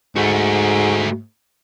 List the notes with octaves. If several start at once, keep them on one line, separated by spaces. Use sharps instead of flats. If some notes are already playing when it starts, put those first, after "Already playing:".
G#2 A3 F#4